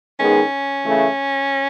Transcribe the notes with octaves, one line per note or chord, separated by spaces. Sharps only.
D#3 G#3 B3 C#4 D#4 G#4
C#3 E3 A3